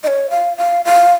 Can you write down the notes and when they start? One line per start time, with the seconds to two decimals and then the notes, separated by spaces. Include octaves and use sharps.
0.03 D#5
0.07 C#5
0.30 F5
0.57 F5
0.85 F5